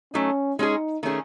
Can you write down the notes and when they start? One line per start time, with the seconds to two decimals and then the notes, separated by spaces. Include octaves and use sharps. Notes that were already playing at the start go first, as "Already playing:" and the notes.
0.14 F#3 A3 C#4 D#4
0.58 G#3 C#4 D#4 G#4
1.03 D#3 A3 C#4 G#4